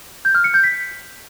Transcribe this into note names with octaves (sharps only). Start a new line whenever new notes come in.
G6
F6
C#7
G6
B6